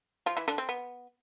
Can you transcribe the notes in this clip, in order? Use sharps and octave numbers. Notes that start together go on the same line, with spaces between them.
F3 F4
E3 E4
D3 D4
C4
B3